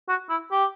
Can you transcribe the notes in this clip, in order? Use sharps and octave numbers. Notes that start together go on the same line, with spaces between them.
F#4
E4
G4